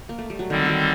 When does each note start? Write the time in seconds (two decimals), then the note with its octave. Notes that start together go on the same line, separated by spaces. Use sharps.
0.09 A#3
0.18 A3
0.30 G3
0.39 F#3
0.50 D3 D#3 G3 C4
0.65 D#3 F#3